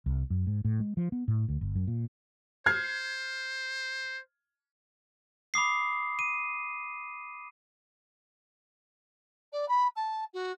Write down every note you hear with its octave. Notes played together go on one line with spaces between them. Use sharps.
C2
F#2
G#2
A2
G#3
F3
B3
A2
D2
G1
F#2
A#2
C5 F6 G#6 C7
B5 D6 D#6 C7
D#7
D5
B5
A5
F#4